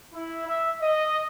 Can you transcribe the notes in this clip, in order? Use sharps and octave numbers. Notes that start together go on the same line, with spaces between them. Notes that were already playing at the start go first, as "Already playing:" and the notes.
E4
E5
D#5